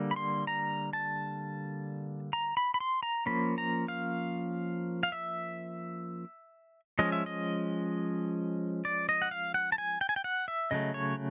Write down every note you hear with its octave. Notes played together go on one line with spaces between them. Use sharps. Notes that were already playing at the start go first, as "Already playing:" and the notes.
Already playing: D3 G3 A#3
B5
C6
A#5
A5
A#5
B5
B5
C6
A#5
F3 A#3 C#4 B5
A#5
F5
F5
E5
F3 G#3 C#4 D#5
E5
D#5
D5
D#5
F#5
F5
F#5
A5
G#5
G5
G#5
G5
F#5
E5
C#3 F#3 A3 D#5
C#5